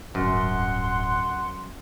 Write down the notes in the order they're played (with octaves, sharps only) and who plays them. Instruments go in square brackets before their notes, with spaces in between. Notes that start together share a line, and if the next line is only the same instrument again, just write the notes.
[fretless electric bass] D1 G1 [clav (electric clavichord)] F#2 [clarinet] F#5 [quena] C6